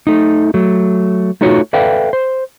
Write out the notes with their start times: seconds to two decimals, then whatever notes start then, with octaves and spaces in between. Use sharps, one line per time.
0.07 A3 D#4
0.54 F#3 A3
1.41 A3 D#4 F4 F#4 C#5
1.73 A4 B4 D5 E5 F5 G5
2.13 C5